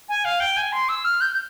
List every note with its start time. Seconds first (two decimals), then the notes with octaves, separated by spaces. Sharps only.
0.09 G#5
0.25 F5
0.40 G5
0.57 G#5
0.72 C6
0.89 E6
1.05 F6
1.21 G6